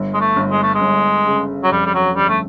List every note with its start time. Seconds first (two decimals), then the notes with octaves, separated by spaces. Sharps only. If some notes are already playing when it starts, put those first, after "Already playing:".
Already playing: G1
0.14 G#3
0.21 A3
0.36 G1
0.51 G#3
0.62 A3
0.74 G#3
0.81 G1
1.27 C#3
1.63 F#3
1.72 F2 G3
1.85 G3
1.94 F#3
2.16 G1 G3
2.29 A3